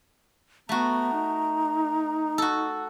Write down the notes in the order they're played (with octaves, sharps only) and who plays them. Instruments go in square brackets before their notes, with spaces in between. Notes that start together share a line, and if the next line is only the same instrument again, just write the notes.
[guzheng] A3 F#4 [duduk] B3 [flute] A#5
[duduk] D#4
[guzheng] F#4 A4